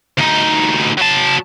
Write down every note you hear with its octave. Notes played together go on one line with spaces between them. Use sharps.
D2 D#4
F#3 A5